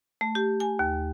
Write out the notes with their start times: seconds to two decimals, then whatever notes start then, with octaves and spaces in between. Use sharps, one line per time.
0.21 A3
0.35 G4
0.60 G#5
0.79 D#2